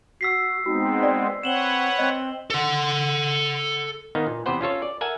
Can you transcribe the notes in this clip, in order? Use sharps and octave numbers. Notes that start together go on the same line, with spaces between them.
F#4 E6 B6 C7
G#3 B3 C4 D#4 F#4
D5
C4 B4 C#5 F#5 E7 F#7 G7
C4 D#5
A4 F#5
D#3 A#3 B3 D#4
A#2
E2 C3 G4 B4 C5 F#5
C#4 F4 A4 C#5
D5
A4 A#4 E5 F#5 G#5